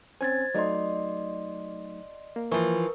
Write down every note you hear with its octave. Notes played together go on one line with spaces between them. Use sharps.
C4 C#4 C5 G#5 G#6 A6
F#3 A3 D#4 D5 D#5 C6
A#3
E3 F3 A#4 B4 C#6